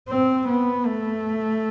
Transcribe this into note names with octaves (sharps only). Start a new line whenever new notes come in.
C4
B3
A3